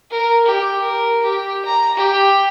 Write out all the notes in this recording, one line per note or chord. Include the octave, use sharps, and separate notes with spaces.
A#4
G4
A#4
G4
A#5
G4